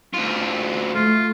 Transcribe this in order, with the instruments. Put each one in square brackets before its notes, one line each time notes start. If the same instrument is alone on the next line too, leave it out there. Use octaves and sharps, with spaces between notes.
[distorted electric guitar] D2 F4
[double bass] A3 [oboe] F4